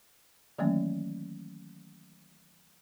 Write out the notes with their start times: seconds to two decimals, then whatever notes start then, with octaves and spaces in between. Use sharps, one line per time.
0.58 D#3 E3 F#3 A3 A#3 C#4